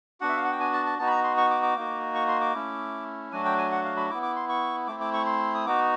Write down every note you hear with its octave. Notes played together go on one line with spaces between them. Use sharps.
B3 D4 F#4 F#5
E5
F5
F#5
G5
G#5
A5
A5
B3 D#4 F#4 A5
B5
A#5
C6
C#6
D6
D6
A#3 D#4 F#4
C#6
C6
D6
A3 C#4 E4
F#3 A3 D4 F#4 G#5
G5
G#5
F#5
F5
B5
B3 E4 D6
D6
C6
C#6
A3 C4 E4 D6
D6
C#6
C6
D#6
B3 D#4 F#4 D6